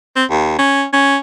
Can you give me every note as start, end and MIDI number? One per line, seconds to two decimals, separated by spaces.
0.16 0.25 60
0.30 0.54 39
0.59 0.85 61
0.93 1.18 61